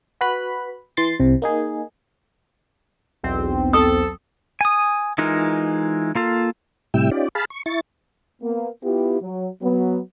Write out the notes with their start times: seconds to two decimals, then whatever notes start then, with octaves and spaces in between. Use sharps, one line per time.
0.21 F#4 B4 B5
0.97 E3 C6 A6 C7
1.20 C2 C3
1.42 A#3 D#4 G#4
3.23 B1 E2 C4
3.73 A4 D#6
4.61 G#5 D#6
5.18 E3 G#3 D#4 F4 A#4
6.15 A#3 F4 A4
6.94 A2 C3 G3 E4 G5 E6
7.11 C#4 D#4 F4 G4 D5
7.35 G#4 F5 A5 B5
7.50 C#6
7.66 E4 C#6 A6
8.42 A#3 B3
8.84 B3 E4 F4 G4
9.21 F#3
9.62 F#3 B3